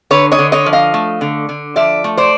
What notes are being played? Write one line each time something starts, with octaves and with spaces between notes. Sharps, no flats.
D3 B4 C#5
C#5 D#5
D3
C#5 D#5
F3
D#5 F5
A3
D3
D3
F3 D5 E5
A3
C5 D5